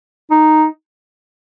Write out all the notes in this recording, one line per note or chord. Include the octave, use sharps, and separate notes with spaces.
D#4